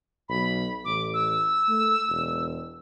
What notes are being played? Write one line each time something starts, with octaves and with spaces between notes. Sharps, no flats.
B1 B5
A1 D6
E6
A3
E1